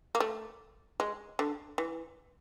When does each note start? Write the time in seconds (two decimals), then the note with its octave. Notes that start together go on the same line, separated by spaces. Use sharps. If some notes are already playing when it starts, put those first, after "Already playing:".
0.15 A#3
0.20 A3
1.00 G#3
1.39 D3
1.78 E3